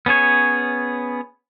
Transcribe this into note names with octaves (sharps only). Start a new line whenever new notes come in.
B3 C#4 G#4 C#5